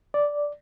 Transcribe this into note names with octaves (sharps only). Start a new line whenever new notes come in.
D5